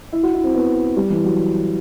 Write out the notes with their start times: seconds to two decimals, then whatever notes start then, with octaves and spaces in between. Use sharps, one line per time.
0.13 E4
0.23 F#4
0.34 E4
0.44 C4
0.55 B3
0.96 G3
1.10 E3
1.24 F#3